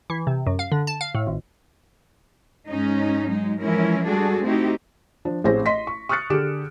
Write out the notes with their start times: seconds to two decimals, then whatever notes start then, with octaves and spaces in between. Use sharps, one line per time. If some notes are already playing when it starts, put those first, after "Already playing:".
0.10 E3
0.27 C3
0.47 F#2
0.59 F5
0.72 D3
0.87 A5
1.01 F5
1.15 A2
1.27 G#1
2.68 G#2 G#3 C#4 D#4
3.27 F#3 G#3 D#4
3.59 E3 F3 G#3 C#4 E4 A#4
4.05 G3 G#3 D4 F#4 G#4 A4
4.43 A3 C4 D#4 E4 F#4 G4
5.25 F3 D4
5.44 A1 C4 G#4 C5 A#6
5.66 D#5 C6 B6
5.87 C#6
6.09 C#6 D#6 F6 F#6 A6 C#7
6.30 D3 G4 G#4 D6 D7 E7